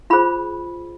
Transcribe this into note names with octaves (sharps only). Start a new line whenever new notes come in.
F4 G#4 C5 B5